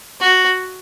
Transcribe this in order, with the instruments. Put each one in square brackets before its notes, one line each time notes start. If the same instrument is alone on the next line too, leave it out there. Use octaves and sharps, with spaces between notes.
[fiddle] F#4